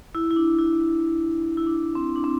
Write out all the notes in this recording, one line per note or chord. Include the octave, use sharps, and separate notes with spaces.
E4
E4
D4
E4
E4
D4
C4
D4
C4